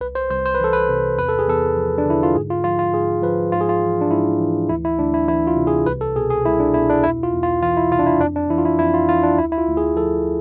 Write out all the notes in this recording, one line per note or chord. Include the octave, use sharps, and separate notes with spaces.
C2 B4
C5
C2 C5
C5
B4
E3 A4
B4
C3
E2 B4
A4
G#4
E2 A4
F3
D4
D3 E4
F4
G#2 G#4
F4
F3 F4
F4
G#2 G#4
F3 B4
G#2 F4
G#4
F4
E3
D4
G#2 E4
E3
D2 E4
E4
D2 D4
E4
E3 E4
F4
C3
G#4
C2 B4
A4
B2 G#4
G#4
C2 E4
D4
B2 E4
D4
E2 E4
F4
E2
F4
E3 F4
E4
C3 F4
D4
E4
F2 D4
D4
E3 E4
F4
E4
F2 E4
F4
E3 F4
D4
D2 E4
E4
F4
D2
G#4
F3 A4